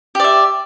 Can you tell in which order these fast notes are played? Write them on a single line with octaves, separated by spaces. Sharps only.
G4 D5 E5